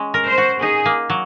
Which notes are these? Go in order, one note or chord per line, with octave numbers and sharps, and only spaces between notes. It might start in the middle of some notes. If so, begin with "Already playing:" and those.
Already playing: G#3 C#4
A#4
C5
F#4
D#4 G#4
A#3
F#3